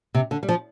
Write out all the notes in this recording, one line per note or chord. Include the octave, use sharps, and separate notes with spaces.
C3
D3
G3
F3